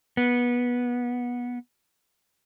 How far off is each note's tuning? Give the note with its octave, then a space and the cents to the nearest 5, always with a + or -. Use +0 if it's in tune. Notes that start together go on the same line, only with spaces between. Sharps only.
B3 -20